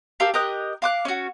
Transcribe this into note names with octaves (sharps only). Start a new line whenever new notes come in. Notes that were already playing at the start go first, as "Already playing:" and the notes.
G4 A4 A#4 F5
G4 A#4 D#5 F#6
F5 D6 F#6
C#4 F#4